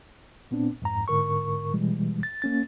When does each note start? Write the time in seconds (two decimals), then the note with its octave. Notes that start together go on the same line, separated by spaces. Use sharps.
0.51 A#2 B3 C4 D4
0.82 F2 G#2 A#5
1.08 G#2 D3 A#4 C#6
1.74 B2 E3 G3 G#3
2.23 A6
2.42 A#3 C#4 A6